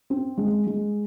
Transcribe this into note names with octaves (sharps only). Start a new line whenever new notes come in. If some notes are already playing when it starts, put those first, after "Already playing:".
C4
G#3
G#3